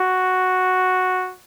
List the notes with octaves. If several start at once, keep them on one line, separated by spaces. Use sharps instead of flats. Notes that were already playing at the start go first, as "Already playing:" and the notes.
Already playing: F#4